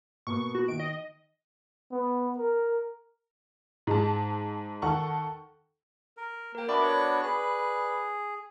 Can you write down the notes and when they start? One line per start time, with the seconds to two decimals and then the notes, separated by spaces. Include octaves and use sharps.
0.27 B2 A#3 B3 C#6
0.55 F#4
0.68 D#3 D7
0.79 D#5
1.92 B3
2.38 A#4
3.87 G#2 G#3 A5
4.82 D#3 A4 F#5 C#6
6.17 A#4
6.55 A#3 A#4 G5
6.69 B3 D4 F#4 D5 E5 B5 D6
6.82 C#5
7.22 G#4 B4